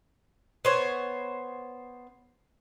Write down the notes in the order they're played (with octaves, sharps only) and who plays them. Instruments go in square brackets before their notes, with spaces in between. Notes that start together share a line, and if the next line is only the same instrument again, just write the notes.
[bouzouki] B3 C5 C#5